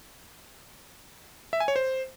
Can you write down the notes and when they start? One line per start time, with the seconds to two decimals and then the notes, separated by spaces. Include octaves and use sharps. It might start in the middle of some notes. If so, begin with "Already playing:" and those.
1.53 E5
1.60 G#5
1.68 C#5
1.76 C5